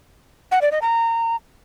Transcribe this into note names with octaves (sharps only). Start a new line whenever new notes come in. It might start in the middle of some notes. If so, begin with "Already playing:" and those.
F#5
D5
D#5
A#5